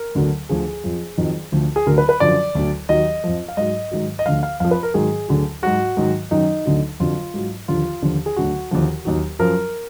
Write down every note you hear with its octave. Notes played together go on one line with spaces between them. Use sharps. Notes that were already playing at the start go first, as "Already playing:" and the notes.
Already playing: A#4
D2 D3 F#3
D2 D3 F3 G#4
F2 F3
F2 D#3 F#3
D2 D3 F3
G#4
D2 D3 F#3 A#4
B4
B4
F#2 D3 F3 D5
D2 D3 F#3
D#2 D#3 F#3 D#5
F2 F3
F5
G#2 F#3 D#5
G#2 D#3 F#3
D#5
D2 D3 F3 F5
F5
F2 F3 F5
B4
A#4
G#2 D#3 F#3 G#4
D2 D3 F#3
G#2 F#3 F#4
G#2 D#3 F#3
F#2 D#3 F#3 D#4
D2 D3 F#3
F2 D3 F#3 F4
G#2 F#3
D#2 D3 F3 F4
D#2 D3 F3
G#4
D2 D3 F#3 F#4
D#2 D3 F3
D#2 D#3 F#3
F#2 F3 A#4